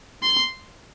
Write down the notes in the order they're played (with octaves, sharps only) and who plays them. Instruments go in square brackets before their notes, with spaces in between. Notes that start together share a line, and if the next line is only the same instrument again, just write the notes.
[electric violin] C6